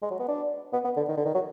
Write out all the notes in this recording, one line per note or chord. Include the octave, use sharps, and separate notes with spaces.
G#3
F#3
B3
D4
B3
B3
D3
D#3
D3
D#3
F#3